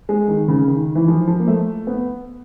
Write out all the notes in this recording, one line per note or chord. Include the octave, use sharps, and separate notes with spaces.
G#3
D#3
C#3
D#3
E3
F3
F3
A#3
A3
B3